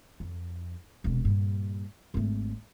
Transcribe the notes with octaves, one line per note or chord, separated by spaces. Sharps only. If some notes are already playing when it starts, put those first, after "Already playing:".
F2
E1 C3
G2 A#2
G#1 A3